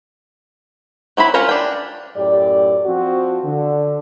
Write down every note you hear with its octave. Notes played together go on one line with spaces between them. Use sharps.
F#3 C4 E4 B5
C#4 F4 A#4 C5 C#5
D4 G5
F#2 A2 G4 D5
F3 C4 F#4
D3